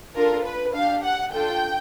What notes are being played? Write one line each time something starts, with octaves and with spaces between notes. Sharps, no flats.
D4 F4 A4 A#4
B4
D4 G4 F5
F#5
D4 F4 A4 G5